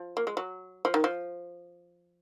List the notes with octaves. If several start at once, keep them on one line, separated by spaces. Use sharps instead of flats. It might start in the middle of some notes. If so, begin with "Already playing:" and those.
Already playing: F3
A#3
G#3
F#3
F3
D#3
F3